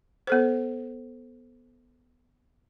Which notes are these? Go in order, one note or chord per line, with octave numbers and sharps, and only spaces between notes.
B3 A4 C5